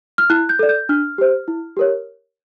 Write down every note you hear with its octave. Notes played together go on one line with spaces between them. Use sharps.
F6
E4 F#6
G6
A4 D5
G6
D4 F6
G4 C5
E4
G4 A#4 C#5